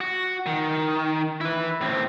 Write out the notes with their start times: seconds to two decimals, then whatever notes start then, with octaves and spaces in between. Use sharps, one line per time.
0.01 F#4
0.46 D#3
1.41 E4 B4
1.81 A2 C4